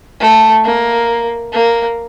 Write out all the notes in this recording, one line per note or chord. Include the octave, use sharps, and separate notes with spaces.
A3
A#3
A#3